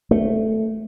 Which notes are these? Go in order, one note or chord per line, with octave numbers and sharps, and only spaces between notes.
A3